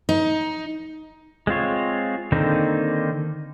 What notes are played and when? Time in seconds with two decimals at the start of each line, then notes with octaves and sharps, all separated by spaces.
0.09 D#4
1.47 G#3 C4 F4 C#5
2.32 D3 D#3 A#3 C4 D#4